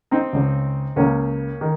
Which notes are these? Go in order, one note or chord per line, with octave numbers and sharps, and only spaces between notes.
C4 D#4
C#2 C#3
C#2 C#3 A#3 C#4
D#3